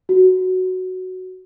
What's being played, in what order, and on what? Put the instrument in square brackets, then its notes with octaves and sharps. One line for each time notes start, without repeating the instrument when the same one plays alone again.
[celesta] F#4